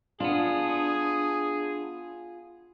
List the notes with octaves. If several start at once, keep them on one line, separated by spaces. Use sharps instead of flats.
B3 D4 F4 G#4